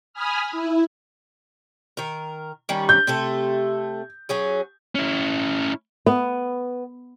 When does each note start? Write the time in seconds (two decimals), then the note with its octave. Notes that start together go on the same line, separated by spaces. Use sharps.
0.13 G#5 B5 D#6 F6
0.52 E4
1.97 D#3 A#4
2.69 D#3 G3 C#4
2.89 G6
3.07 C3 A3 A4
4.29 F#3 C#4 G#4
4.95 C#4 E4
6.06 B3